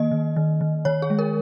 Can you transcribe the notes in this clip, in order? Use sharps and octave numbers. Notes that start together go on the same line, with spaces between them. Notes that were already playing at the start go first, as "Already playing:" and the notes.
Already playing: D#3 A#3 D#5
D#3
D#3
D#3
D#3 C#5
G#4
G#3
A#4